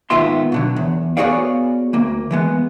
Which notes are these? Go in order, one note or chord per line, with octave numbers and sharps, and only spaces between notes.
G#2 D#3 B3 F4 E5 C6
B2 D3 F#3
E2
B3 F#4 G#4 C#5 D5 F5
D2 A#3
E3 G#3 B3